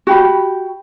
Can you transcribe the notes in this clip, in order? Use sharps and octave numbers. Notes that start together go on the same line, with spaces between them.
F#4 G4 B5